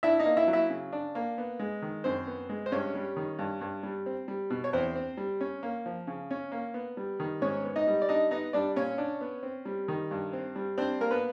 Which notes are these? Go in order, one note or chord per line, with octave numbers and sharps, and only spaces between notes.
D4 E4 E5
D#4 D#5
A#3
E4 E5
F#3
E4 E5
C#3
D4
A#3
B3
G#3
D#3
F#2 C4 C5
B3
G#3
C5
G2 C#4 C#5
G3
D#3
G2
G2
G3
C4
G3
B2
C#5
E2 C4 C5
C4
G3
C#4
A#3
F3
C#3
C#4
A#3
B3
G3
D#3
G#2 C#4 C#5
B3
D#4 D#5
G3
D5
D4 D#4 D#5
B3 D#4 D#5
G3 D4 D5
A#2 C#4 C#5
D4
B3
C4
G3
D#3
G2
C4
G3
C4 D4 C5
A#3 A#4
B3 B4